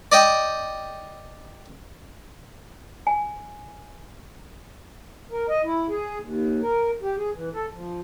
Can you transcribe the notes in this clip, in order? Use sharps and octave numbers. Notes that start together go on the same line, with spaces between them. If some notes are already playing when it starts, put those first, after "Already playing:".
D5 D#5 G5
G#5
A#4
D#5
E4
G#4
D#2
A#4
G4
G#4
E3
A4
F3